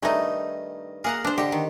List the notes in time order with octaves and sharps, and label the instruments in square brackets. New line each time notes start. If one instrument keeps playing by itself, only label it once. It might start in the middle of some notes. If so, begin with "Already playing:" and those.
[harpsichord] G2 D#3 G#5 [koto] A3 D#4
[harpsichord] A#3 A#4 [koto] G#4 F#5 A#5
[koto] D4 C5
[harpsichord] D3 D#5 C#6 [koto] G4
[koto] D#3